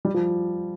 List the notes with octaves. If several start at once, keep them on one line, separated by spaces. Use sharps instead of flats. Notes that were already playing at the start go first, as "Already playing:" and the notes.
G3
F3